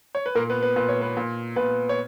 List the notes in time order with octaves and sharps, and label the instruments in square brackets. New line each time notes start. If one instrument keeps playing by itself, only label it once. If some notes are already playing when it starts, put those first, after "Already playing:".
[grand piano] C#5
B4
A#2 A#3 A#4
B3 B4
B3 B4
A#2 B4
C#5
B3 B4
A#2
A#2 B3 B4
C#5